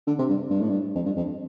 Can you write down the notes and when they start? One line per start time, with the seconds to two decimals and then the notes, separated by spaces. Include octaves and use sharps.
0.07 D3
0.19 C3
0.29 G2
0.51 G2
0.61 A2
0.70 G2
0.95 F2
1.06 G2
1.16 F2